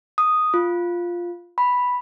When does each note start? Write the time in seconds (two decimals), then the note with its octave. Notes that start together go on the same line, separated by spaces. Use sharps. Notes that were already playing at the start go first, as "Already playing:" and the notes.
0.18 D#6
0.54 F4
1.58 B5